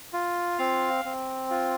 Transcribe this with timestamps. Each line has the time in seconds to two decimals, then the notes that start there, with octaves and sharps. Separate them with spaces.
0.13 F4
0.58 C4 F5
1.05 C4
1.50 F4